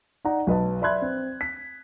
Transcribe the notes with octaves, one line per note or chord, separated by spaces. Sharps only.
D#4 D5 F#5 A#5
B1 B4 D#5 A5
D5 E5 B5 C6 F#6 G#6
C4
B6